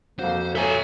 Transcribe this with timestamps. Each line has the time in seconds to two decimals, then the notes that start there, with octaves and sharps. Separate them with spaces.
0.19 F2 A#3 F#4 C5
0.55 A4 C#5 E5 G#5 A#5